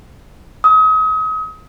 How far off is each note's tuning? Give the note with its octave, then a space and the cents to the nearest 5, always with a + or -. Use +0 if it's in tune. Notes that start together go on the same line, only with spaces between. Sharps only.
D#6 +35